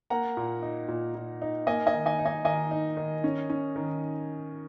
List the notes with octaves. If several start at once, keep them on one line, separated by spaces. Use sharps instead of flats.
A#3 F#5 A#5
A#2
D#4
A#2
A#2
D#4
A#3 D#5 G#5
D#5 G#5
D#3
D#5 G#5
D#4
D#5 G#5
D#3 D#5 G#5
D#4
D#3
C#4
C#4
D#3